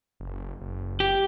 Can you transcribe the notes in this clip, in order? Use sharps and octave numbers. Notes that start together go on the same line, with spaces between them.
F#1
F#1
G4